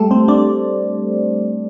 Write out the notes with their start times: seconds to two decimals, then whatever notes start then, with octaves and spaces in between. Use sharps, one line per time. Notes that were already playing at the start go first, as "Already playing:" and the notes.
Already playing: G3 A3 G4 A4
0.11 C4 C5
0.28 D4 D5